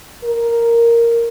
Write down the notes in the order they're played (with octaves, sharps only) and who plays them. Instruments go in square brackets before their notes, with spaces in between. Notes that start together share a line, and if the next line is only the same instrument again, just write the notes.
[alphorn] A#4